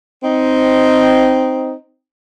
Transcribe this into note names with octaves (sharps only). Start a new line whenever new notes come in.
C4 D#4